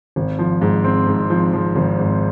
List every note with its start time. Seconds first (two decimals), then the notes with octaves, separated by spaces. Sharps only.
0.16 G#1
0.39 F3
0.61 G#2
0.84 C4
1.07 G#2
1.30 F3
1.53 F3
1.76 G#1
1.98 G#2